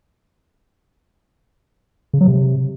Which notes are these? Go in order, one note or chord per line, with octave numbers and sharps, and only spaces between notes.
C#3
F#3
C3